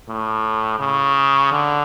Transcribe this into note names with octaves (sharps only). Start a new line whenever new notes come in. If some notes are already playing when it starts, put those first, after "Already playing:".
A2
C#3
D3